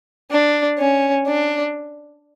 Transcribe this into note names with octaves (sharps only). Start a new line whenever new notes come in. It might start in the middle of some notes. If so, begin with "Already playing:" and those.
D4
C#4
D4